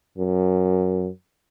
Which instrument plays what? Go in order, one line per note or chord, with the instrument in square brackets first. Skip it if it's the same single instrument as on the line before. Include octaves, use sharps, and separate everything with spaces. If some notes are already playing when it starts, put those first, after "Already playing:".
[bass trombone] F#2